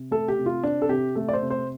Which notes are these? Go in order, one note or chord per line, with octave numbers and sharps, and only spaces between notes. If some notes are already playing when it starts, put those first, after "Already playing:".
Already playing: C3
A3 A4
G4
C3
F4
C4 D4
A4
C3 G4
A3 A4
D5
C5
C3
C5